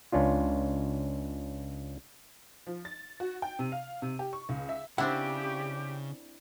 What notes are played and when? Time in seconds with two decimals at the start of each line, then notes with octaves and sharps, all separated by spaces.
0.12 C#2 C#4 D4 F4
2.67 F3
2.85 A6
3.20 F#4
3.42 G5
3.59 C3
3.72 F5
4.02 C3
4.19 G4
4.33 C#6
4.49 C#2
4.69 E5
4.98 C#3 C4 D4 E4 G4 F#5